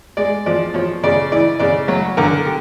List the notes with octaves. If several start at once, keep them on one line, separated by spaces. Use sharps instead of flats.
G#3 D5
F3 D5
F3 C#5
C#3 D5
E3 D5
C#3 D5
F#3 C#5
D3 A#4
G4